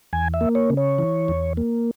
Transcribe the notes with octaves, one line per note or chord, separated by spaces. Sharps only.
E2 G#5
E5
A#3
C#5
C#3
C#5
E3
E2
A#3